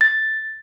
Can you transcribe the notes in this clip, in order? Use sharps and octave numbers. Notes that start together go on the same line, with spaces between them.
A6